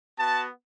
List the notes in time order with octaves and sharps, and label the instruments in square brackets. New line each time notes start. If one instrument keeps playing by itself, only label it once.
[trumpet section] B3 F#4 A5